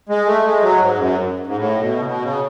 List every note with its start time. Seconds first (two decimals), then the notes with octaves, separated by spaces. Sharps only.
0.09 G#3
0.27 A3
0.45 G#3
0.62 F#3
0.80 G#2
0.98 F#2
1.47 G#2
1.56 A2
1.81 B2
2.00 C#3
2.05 B2
2.22 C#3